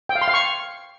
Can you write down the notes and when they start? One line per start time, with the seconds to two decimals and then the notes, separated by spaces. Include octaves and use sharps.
0.09 G5
0.15 F5
0.22 C6
0.28 F5
0.34 C#6